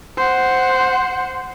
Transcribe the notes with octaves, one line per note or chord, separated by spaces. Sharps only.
C5 F#5